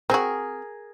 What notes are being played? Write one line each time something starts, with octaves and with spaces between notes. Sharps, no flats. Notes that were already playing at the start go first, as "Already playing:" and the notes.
C4 F#4 G#4 A#4